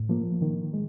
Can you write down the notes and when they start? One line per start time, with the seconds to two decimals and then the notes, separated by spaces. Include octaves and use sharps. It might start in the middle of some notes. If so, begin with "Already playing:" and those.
Already playing: A2
0.09 F3 A#3
0.42 D#3
0.73 G#3